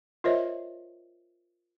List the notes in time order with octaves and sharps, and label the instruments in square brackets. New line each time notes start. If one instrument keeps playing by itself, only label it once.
[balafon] F4 A#4 C5 C#5 D#5 E5